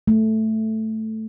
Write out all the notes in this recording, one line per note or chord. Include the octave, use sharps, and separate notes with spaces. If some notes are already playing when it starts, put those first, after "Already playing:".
A3